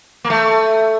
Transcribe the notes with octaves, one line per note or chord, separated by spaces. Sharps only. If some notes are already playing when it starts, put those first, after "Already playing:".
A#3
A3